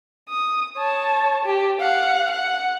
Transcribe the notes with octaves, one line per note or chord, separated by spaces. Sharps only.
D#6
C#5 A5
G4
F5 F#5
F#5